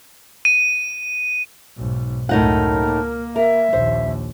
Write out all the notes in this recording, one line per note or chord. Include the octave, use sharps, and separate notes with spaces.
D#7
B1 G#2
C#2 F#2 A2 D#4 A#4 F#5
A#3
A#4 E5
A#1 D#2 C5